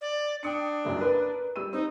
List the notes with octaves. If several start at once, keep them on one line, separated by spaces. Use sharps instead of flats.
D5
D4 G5 D#6 C#7
F#1 C2 F#2
A#4 B4
G3 E6 D#7
C4 D#4